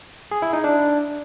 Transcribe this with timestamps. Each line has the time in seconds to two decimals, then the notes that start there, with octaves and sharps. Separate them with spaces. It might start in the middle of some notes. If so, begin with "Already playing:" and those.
0.31 G#4
0.42 E4
0.53 D#4
0.64 D4